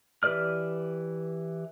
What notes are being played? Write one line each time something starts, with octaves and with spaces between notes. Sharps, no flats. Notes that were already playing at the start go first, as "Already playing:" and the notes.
E3 G4 B4 D5 F6